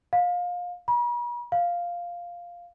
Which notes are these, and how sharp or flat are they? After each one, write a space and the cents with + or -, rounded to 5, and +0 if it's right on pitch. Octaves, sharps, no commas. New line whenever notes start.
F5 +25
B5 -45
F5 +0